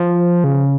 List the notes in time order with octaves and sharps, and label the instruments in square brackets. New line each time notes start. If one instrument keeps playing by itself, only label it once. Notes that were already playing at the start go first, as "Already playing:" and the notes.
Already playing: [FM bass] F3
C#3